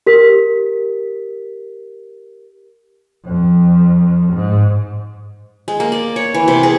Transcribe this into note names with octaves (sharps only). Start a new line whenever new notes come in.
G4 A#4 B6
F2
G#2
G#3
A#3
D5
C#5
E3
C3
G#4